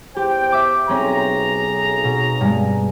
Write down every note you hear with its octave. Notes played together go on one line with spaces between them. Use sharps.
E2 G4 C5 G5
E5 D6
B1 C4 C#4 G#4 A#5
B2
G2 G#3